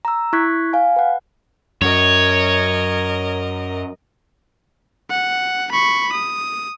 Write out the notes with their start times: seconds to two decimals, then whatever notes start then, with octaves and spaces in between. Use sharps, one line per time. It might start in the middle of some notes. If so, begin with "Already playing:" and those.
0.05 A#5 E6
0.33 E4 C#6 F#6 G#6 B6
0.73 F5 G#5
0.96 B4 F#5
1.82 F#2 F#3 A#4 C#5 D#5
5.10 F#5
5.71 B5 C#6
6.13 D#6